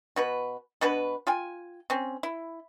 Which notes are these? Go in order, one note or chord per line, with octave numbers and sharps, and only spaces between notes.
B2 F#4 B4
B2 D4 F#4 B4
F4 G5 G#5
C4 C#4
E4